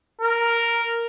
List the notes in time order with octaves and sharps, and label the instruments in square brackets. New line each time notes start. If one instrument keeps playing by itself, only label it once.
[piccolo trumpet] A#4